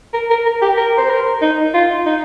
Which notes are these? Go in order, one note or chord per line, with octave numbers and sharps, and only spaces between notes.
A#4
A#4
A#4
G4
A#4
C5
A#4
D#4
F4
D#4